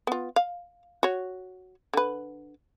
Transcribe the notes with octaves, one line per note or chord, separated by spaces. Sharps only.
B3 F4
F5
F#4 C#5
D3 B4